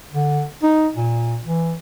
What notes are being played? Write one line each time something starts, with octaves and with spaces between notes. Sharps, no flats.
D3
D#4
A#2
E3